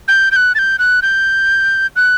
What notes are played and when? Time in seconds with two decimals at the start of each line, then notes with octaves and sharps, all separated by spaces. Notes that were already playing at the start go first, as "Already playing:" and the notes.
0.08 G6
0.31 G6
0.36 F#6
0.55 A6
0.59 G6
0.79 F#6
1.02 G6
1.96 F#6